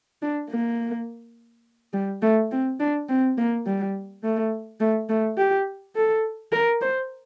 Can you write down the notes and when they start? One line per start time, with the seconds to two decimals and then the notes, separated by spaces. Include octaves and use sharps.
0.22 D4
0.51 A#3
1.94 G3
2.22 A3
2.52 C4
2.80 D4
3.09 C4
3.38 A#3
3.67 G3
4.24 A3
4.80 A3
5.09 A3
5.38 G4
5.96 A4
6.53 A#4
6.81 C5